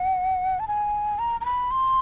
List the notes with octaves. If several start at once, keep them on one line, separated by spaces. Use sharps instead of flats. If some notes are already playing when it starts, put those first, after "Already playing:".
Already playing: F#5
A5
G#5
A#5
A#5
B5
C6